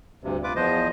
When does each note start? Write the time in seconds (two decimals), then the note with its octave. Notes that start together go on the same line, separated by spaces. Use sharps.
0.24 D2 G2 C3
0.44 F4 B4 D6
0.56 E2 F3 C5 D#5